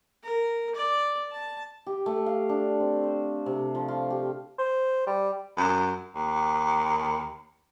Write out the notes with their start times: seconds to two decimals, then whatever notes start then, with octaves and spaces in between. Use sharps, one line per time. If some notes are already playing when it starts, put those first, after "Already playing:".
0.23 A#4
0.75 D5
1.31 A5
1.87 G4
2.06 A3
2.26 F5
2.49 D4
2.80 C4
3.04 C5
3.46 C3
3.75 F3
3.88 F4
4.10 G4
4.59 C5
5.07 G3
5.57 F#2
6.15 D#2